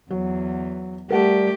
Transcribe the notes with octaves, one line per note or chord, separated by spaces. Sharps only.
E2 F#3
G3 A3 G4 A#4 F#5 A5